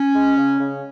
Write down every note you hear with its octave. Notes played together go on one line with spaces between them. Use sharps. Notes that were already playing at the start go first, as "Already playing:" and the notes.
Already playing: C#4
G#3
C#3
C#3